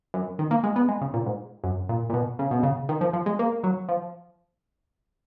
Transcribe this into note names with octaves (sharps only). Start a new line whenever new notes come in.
F#2
D#3
A#3
G#3
B3
G#3
C#3
A#2
G#2
F#2
A#2
A#2
B2
C#3
B2
C#3
D#3
F3
F3
G#3
A#3
F#3
F3